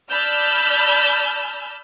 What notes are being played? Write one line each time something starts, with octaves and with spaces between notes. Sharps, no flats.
D5 A5 B5 E6 F6 G6